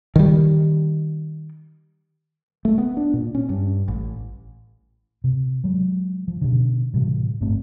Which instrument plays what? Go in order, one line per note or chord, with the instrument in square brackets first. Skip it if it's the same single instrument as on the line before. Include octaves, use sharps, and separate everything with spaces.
[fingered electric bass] D#3 G3
A3
B3
D4
A#2
C#4
G2
A1
C3
F#3 G#3
F3
B2 D3
A2 C3 E3 G3
G1 A2 A3 C4